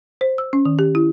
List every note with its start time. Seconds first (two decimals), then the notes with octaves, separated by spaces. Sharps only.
0.21 C5
0.38 E6
0.53 C#4
0.65 D#3
0.79 G4
0.95 E4